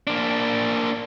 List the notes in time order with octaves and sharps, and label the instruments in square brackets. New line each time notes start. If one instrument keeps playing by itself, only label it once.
[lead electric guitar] A#3 D4